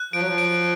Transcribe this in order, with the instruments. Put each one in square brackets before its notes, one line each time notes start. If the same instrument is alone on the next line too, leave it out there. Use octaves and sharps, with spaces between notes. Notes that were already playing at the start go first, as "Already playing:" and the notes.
Already playing: [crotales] F#6
[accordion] F3 [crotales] D7
[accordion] F#3
F3
[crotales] D7